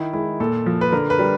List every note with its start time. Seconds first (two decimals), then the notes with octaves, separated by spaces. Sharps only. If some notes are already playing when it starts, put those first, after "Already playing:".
Already playing: D#3 E4
0.13 G#3 E4
0.40 A#2 A4
0.66 F3
0.81 B4
0.92 D3 A#4
1.10 B4
1.19 G3